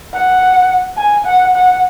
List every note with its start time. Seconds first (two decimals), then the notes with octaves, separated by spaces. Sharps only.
0.14 F#5
0.98 G#5
1.26 F#5
1.55 F#5